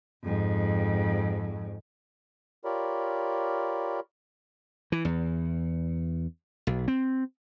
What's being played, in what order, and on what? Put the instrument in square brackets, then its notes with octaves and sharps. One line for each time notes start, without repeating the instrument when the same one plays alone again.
[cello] F2 G#2
[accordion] F4 G4 A#4 C#5 D5 B5
[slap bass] E3
E2
B1
C4